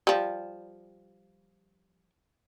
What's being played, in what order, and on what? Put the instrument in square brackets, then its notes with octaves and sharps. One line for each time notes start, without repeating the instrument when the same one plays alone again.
[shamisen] F3 G3